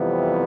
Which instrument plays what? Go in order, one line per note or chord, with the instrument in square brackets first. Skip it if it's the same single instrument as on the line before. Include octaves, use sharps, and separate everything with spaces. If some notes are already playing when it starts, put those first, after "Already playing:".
Already playing: [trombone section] F2 C3 E3 G3 B3